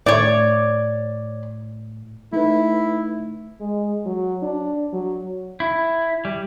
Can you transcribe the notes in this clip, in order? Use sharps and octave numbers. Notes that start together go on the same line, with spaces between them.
A2 C#5 D5
A3 D#4 E4 B4
G#3
F#3
D4
F#3
E4
G3